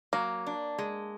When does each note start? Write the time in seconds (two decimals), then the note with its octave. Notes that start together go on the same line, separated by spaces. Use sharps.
0.13 F#3 A#3
0.46 D4
0.78 G#3